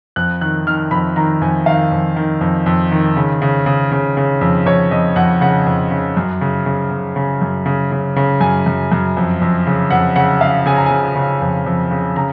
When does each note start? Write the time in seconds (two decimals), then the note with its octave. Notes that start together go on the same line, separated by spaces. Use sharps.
0.16 F2 F#6
0.41 D#3 F#6
0.67 D#3 F6
0.91 F2 B5
1.16 D#3 A#5
1.41 F2 G#5
1.66 D#3 F5
1.92 F2
2.16 D#3
2.41 F2
2.66 F2
2.91 D#3
3.17 C#3
3.42 C#3
3.66 C#3
3.92 C#3
4.17 C#3
4.41 F2
4.66 F2 C#5
4.91 F2 D#5
5.16 F2 F#5
5.41 C#3 F#5
5.66 F2
5.91 C#3
6.17 F#2
6.41 C#3
6.66 C#3
6.91 C#3
7.16 C#3
7.41 F#2
7.66 C#3
7.92 C#3
8.16 C#3
8.41 F#2 G#5
8.66 F#2
8.92 F#2
9.17 F2
9.41 F2
9.67 C#3
9.90 F2 F#5
10.16 C#3 F#5
10.41 C#3 F5
10.66 C#3 G#5
10.76 A#5
10.86 C#3 G#5
11.16 C#3
11.42 F2
11.66 F2
11.91 C#3
12.16 C#3 A#5